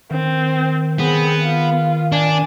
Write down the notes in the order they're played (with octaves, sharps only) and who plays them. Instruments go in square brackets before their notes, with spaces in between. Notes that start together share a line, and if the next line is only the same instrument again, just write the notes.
[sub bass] D#3 [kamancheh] C4
[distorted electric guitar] B3 [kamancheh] C4 G#4
[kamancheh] F4
[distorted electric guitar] D4 [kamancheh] D5 G#5